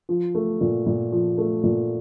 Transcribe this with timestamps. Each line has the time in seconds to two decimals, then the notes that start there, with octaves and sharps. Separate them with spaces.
0.09 F3
0.35 A3
0.61 A#2
0.86 A#2
1.12 F3
1.38 A3
1.63 A#2